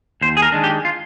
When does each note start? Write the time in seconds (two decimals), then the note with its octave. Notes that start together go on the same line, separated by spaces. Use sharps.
0.21 D#2 C5
0.37 G#4
0.42 A#4
0.52 D#3 G#3 D4
0.64 G4
0.85 F4